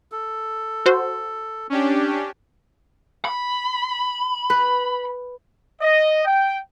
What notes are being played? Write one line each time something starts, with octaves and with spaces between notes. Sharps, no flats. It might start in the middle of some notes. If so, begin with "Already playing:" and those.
A4
F#4 C5
C#4 D4 G4
B5
B4
D#5
G5